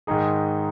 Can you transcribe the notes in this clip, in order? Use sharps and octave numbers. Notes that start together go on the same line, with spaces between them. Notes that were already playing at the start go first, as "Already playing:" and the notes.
G#2 D#3 G#3 D#4 G#4